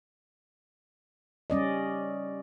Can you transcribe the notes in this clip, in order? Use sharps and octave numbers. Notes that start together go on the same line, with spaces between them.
G3 C#4 D5 D#5